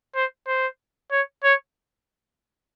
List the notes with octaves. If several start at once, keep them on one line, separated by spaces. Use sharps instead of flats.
C5
C5
C#5
C#5